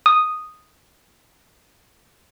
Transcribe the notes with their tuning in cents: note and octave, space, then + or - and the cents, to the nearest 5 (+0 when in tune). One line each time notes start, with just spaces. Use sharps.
D#6 -5